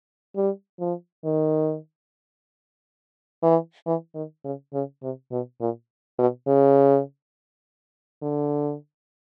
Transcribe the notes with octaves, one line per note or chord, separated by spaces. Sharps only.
G3
F3
D#3
E3
E3
D#3
C#3
C#3
C3
B2
A#2
B2
C#3
D3